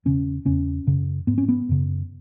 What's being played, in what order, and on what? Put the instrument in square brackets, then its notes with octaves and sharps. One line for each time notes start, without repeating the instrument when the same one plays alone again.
[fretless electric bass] E2 C#3 C#4
E2 C#3 C#4
F#2 C#3
G#2 B3
C#4
B3
F#2 C#3